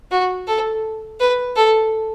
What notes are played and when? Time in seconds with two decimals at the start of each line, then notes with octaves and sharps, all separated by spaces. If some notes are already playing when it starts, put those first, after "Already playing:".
0.11 F#4
0.48 A4
1.20 B4
1.57 A4